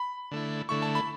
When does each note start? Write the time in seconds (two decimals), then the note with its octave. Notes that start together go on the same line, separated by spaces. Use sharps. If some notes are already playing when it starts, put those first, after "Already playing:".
Already playing: B5
0.31 D3 A3 E4
0.69 D3 A3 E4 C#6
0.82 A5
0.95 B5